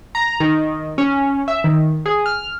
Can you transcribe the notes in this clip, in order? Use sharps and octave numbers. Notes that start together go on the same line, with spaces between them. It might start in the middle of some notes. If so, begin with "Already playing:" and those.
A#5
D#3
C#4
E5
D#3
G#4
F6